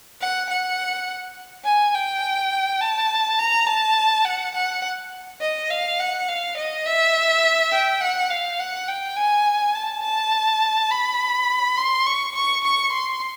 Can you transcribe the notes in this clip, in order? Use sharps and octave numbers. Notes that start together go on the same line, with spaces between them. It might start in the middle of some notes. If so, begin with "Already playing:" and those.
F#5
F#5
G#5
G5
A5
A#5
A5
F#5
F#5
D#5
F5
F#5
F5
D#5
E5
G5
F#5
F5
F#5
G5
G#5
A5
A5
B5
C6
C#6
C#6
C#6
C6